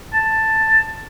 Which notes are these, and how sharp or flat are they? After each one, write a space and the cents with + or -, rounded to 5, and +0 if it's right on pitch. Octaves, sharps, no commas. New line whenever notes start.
A5 +5